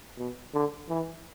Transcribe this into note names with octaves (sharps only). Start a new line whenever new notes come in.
B2
D3
E3